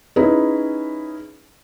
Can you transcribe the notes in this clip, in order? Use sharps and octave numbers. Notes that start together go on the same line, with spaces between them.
C#4 D#4 E4 G#4 B4